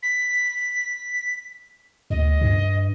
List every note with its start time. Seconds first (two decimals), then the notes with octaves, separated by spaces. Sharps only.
0.03 B6
2.10 D2 D#5
2.41 G2